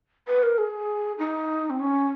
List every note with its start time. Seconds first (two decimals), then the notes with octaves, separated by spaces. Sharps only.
0.28 B4
0.43 A#4
0.58 G#4
1.18 D#4
1.70 C4
1.80 C#4